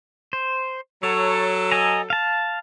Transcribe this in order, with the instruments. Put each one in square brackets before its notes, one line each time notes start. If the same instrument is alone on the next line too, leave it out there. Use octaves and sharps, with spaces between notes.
[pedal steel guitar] C5
[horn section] F#3 A4 [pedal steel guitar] C#5
[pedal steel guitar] D#5 G#5 A#5
F5 A5